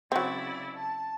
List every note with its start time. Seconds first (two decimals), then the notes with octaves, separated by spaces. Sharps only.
0.12 C#3 F#3 C4 E4 D5
0.74 A5